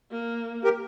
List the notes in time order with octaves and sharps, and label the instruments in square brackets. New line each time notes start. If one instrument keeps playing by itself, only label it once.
[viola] A#3
[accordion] G4 A#4